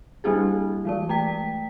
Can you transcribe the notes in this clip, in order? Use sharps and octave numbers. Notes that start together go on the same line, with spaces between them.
G3 A#3 D4 E4 G4 G#4
E3 G#3 D5
A3 G5 B6